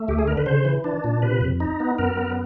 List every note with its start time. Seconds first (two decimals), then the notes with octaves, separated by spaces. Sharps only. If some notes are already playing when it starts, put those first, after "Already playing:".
Already playing: A3
0.08 D2 G4
0.18 G#4
0.27 D3 A#4
0.37 B4
0.46 C#3 C5
0.65 E3
0.84 D4
1.04 A#2
1.22 C3 B4
1.41 F2
1.60 D#4
1.80 B3
1.98 F#2 A#4
2.17 B3